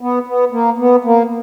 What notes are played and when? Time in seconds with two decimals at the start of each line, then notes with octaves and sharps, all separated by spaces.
0.01 B3
0.27 B3
0.52 A#3
0.78 B3
1.05 A#3